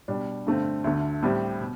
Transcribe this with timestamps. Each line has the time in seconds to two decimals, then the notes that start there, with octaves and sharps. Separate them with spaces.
0.08 B2 G3 D4
0.46 G2 D3 A3 C4
0.84 D2 D3 A3
1.22 A2 G3 C4 G4
1.61 B2